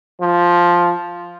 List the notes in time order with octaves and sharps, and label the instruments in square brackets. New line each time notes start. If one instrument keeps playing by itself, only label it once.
[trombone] F3